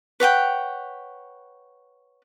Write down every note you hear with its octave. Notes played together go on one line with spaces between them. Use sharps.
B4 C#5 F#5 G5